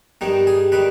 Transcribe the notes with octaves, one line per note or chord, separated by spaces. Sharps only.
G2 D#3 G3 D#4
G#4
D#3 G3 B4